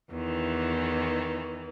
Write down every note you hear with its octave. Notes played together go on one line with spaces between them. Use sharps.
E2 D#3 E3